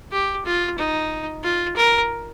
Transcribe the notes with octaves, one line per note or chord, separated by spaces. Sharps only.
G4
F4
D#4
F4
A#4